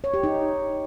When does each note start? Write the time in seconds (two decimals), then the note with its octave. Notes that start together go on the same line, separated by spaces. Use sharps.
0.04 C#5
0.14 G4
0.23 D#4